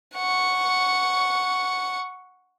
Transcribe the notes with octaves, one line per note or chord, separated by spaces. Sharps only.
F#5 C#6